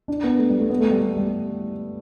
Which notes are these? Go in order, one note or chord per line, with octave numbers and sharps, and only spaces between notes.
D4
B3
A3
G3
A3
B3
A3
G3
G3
G3